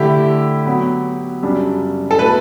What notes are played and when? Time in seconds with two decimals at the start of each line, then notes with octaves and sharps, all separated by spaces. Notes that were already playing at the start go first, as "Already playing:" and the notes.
Already playing: D3 A3 E4 G4
0.65 F#3 B3 F#4
1.43 F#2 C#3 G3 D4
2.11 A4
2.19 B2 A3 E4 B4